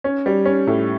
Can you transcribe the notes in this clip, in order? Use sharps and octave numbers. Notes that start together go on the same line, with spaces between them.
C#4
G3
C#4
A2